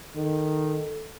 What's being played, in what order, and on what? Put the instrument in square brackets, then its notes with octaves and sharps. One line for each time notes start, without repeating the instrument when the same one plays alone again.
[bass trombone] D#3 [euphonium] A4